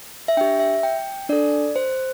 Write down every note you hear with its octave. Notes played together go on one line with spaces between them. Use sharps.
E5
D4 G4 G5
E5
G5
D4 A4 D5
C5